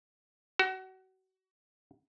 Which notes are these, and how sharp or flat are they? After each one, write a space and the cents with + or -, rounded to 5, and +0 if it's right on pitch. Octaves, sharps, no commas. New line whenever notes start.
F#4 +30